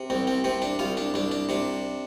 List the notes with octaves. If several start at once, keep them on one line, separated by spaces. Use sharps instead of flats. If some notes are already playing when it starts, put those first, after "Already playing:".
Already playing: C3
C2 C4
C4
C3 C4
D4
C2 F4
D4
C2 D4
D4
C3 D4